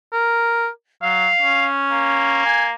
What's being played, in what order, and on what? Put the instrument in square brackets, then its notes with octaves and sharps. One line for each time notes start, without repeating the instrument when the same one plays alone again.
[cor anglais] A#4
[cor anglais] F#3 [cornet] F5
[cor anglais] C#4
[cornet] A#3
[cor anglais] G#5